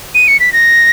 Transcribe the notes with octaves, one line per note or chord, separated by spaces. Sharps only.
D#7
C#7
B6
A#6